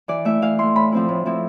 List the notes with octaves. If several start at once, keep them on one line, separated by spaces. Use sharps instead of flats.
E3 D5
A3 E4 E5
E3 F5
A3 E4 C6
A2 B5
F3 C4 E4
A2
F3 C4 E4